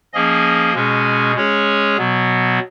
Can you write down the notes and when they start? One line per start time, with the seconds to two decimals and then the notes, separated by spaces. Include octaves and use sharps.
0.13 F3 A#3 C#4 G#4 D#5
0.74 B2 G#3 C#4 G#4
1.36 G#3 C#4 G#4 C#5
1.98 B2 F#3 B3